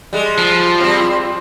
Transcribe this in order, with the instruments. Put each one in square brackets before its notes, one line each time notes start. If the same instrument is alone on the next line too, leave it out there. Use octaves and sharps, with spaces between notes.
[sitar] G3 G#3
[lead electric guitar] F3
[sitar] G3 C4